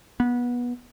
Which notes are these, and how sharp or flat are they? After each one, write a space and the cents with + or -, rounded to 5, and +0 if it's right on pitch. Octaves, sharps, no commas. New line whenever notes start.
B3 -20